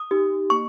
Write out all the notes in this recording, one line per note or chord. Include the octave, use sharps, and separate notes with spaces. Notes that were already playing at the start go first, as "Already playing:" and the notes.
Already playing: D#6
D#4 G4
A#3 C#6